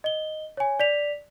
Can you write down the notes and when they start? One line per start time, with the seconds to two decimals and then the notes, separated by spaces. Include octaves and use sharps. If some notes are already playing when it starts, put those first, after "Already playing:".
0.04 D#5 G7
0.57 C#5 G#5
0.80 D5 B6 F7